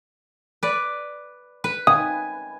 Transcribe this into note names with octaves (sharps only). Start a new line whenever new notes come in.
B4 D5
B4
G#5 D#6